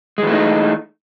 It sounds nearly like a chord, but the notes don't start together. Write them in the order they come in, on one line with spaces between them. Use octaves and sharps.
G#3 E3 A3 D#4